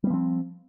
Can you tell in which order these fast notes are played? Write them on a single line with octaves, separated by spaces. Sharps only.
G3 B3 F3 C4